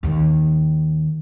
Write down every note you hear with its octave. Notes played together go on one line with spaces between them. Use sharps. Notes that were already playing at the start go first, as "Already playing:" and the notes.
D#2 D#3